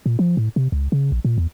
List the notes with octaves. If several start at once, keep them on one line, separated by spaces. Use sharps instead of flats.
A#2
F3
A2
C3
C#2
C#3
A#1
A#2
E2